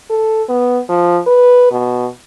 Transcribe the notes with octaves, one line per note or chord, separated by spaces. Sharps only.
A4
B3
F3
B4
B2